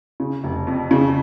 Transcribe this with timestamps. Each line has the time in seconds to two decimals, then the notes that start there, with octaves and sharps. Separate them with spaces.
0.20 C#3
0.44 F1
0.67 F2
0.91 C#3